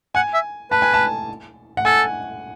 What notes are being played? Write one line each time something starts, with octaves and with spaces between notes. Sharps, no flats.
F#5 G#5
E5
B4 A5
G#5
A5
F#5
A4 G#5